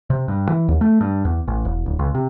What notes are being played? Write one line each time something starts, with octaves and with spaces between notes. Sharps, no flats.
C3
G2
E3
D#2
A3
G2
E2
A1
E1
D1
C#2
C3